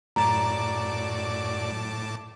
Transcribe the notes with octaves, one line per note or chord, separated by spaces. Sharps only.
F#2 A2 D5 A5 A#5 D6